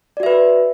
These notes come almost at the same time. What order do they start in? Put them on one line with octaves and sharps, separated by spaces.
D5 F#4 E5 B4